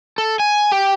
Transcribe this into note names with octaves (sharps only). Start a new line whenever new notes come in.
A4
G#5
G4